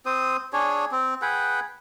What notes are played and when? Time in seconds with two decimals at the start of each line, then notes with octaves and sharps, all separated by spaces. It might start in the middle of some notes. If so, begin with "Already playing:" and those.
0.06 C4 C5 D#6
0.53 D4 G#4 C#5
0.92 C4
1.22 G#4 B4 F#5 G5